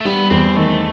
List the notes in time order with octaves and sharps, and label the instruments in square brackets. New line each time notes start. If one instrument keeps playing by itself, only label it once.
[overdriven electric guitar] A3
[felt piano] G3 [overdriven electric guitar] B3
[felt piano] E2 [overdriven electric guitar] C4
[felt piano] D#3 [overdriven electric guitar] A3